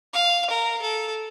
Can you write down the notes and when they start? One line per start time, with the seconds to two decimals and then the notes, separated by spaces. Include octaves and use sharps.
0.14 F5
0.50 A#4
0.82 A4